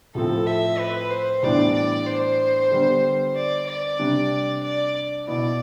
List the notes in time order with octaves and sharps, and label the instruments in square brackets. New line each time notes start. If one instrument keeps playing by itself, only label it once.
[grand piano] A2 F3 C4 [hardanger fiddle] A4
[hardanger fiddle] E5
B4
C5
[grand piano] A2 E3 G3 B3 D4 [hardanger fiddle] D5
[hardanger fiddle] D5
C5
[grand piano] D3 G3 B3
[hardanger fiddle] D5
D5
[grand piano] C3 G3 D4
[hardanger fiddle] D5
[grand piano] B2 B3 E4 [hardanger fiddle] D5